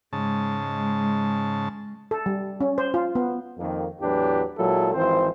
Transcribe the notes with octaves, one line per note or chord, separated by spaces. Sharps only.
G#2 C#3 G#3 A5
A4
G3
C#4
C5
F4
B3
F2 D#3 A#3
E2 A2 F#3 D4 G4 B4
A#2 F#3 G#3 E4 A4
G#1 E3 F3 C4 C5